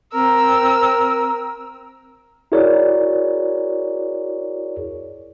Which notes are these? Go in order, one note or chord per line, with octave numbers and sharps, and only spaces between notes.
C4 A#4 E6
E4 F#4 G#4 A#4 C#5 D5